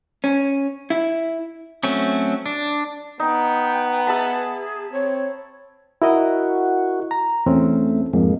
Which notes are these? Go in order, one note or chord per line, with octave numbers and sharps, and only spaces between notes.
C#4
E4
F#3 A3 C4 C#4
D4
B3 D#4 G5
G#4 E5 A5 B5
C4 C#5
E4 F#4 A#4 D#5
A#5
E2 A3 C4 C#4
F2 G#2 G#3 A#3